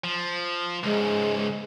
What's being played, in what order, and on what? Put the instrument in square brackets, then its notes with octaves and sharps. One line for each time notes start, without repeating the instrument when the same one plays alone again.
[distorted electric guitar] F3
[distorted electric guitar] C#2 G#2 [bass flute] G#3